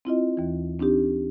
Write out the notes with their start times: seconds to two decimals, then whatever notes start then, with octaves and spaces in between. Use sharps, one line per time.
0.05 C4 E4 F4 D#5
0.37 D#2 E3
0.79 C4 D4 D#4 G4